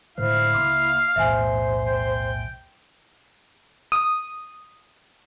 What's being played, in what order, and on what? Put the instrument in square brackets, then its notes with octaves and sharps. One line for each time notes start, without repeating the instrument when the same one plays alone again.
[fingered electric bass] A2 D3 G#3 [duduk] E4 [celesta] C5 [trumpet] F5
[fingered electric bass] C#2 A#3 [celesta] C6 D6
[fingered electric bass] B1 E2 A2 [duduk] C5 [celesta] E5 G#5
[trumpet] G5
[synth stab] D#6